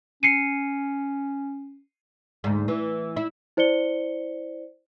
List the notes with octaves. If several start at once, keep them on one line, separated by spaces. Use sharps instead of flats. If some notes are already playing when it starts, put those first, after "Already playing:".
C#4 C7 C#7 D#7
D2 G#2
E3
E4
E4 C5 D5 C#7 G7